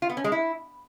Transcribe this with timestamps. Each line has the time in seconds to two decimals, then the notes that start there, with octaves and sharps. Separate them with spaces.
0.02 F4
0.10 B3
0.17 C#4
0.24 G#3
0.32 E4